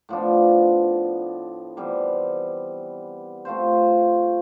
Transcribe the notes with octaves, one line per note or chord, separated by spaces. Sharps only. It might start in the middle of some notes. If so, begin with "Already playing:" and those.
A2 F3 B3 D4
C3 E3 G3 B3
A3 C4 F4 C5